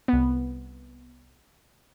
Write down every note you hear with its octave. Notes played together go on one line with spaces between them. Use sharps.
C2 B3